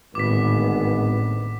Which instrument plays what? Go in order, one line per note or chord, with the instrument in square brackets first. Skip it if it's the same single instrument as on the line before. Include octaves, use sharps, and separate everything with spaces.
[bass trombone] G#1 [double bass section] A2 D3 B3 [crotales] D6 B6